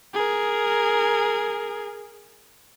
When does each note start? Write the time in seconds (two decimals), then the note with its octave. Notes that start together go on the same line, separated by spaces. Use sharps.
0.14 G#4 A#4